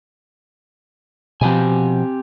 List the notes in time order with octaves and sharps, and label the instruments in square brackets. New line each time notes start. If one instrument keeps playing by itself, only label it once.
[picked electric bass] B2 F3 [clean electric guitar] C4 G4 G#5